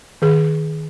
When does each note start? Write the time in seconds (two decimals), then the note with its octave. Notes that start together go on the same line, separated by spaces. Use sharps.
0.22 D#3 G#4